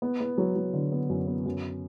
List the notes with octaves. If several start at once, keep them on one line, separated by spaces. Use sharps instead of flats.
B3
B3
F#3
F#3
D3
B3
F#2
B3
F#2